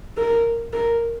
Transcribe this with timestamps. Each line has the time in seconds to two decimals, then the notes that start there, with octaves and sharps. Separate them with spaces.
0.17 A#4
0.73 A#4